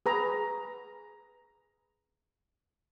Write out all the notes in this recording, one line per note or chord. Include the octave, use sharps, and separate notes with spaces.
G#4 B4 A#5